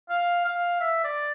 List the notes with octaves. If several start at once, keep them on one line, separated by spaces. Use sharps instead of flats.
F5
F5
E5
D5